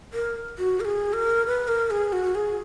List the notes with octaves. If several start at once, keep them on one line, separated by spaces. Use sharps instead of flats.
A#4
F#4
A#4
G#4
A#4
B4
A#4
G#4
F#4
G#4